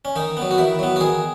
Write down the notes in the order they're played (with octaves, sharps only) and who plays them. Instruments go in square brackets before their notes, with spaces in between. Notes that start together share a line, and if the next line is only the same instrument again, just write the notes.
[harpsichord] C#4
D#3 D#4
F#3 B3
F#4
D#3 E4
F#3 B3
F#4
D#3 G#4